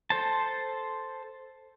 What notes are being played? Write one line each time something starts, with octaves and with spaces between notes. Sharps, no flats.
A4 C5 A5